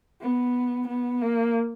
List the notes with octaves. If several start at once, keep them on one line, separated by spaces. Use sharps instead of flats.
B3
B3
A#3